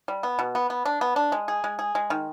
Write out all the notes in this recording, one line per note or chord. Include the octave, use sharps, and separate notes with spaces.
G3
B3
B2
B3
B3
D4
B3
D4
G#3
G#4
G#3
G#4
G#3
D#3